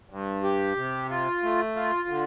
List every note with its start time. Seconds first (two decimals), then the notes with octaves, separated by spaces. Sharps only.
0.10 G2
0.44 G4
0.77 C3
1.10 F4
1.43 A3
1.76 F4
2.08 D3